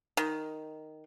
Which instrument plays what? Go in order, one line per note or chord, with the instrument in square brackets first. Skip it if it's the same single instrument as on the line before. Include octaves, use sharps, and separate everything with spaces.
[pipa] D#3